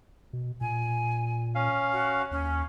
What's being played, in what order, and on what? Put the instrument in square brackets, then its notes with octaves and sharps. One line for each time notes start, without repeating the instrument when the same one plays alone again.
[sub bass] B2
[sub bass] A#2 [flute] G#5
[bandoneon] C#4 F5
[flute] F#4
[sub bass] D#2 [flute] C#4